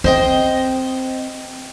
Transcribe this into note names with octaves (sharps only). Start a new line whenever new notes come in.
C4 C5 D#5 G5